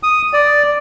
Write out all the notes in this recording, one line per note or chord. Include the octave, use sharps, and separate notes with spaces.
D#6
D5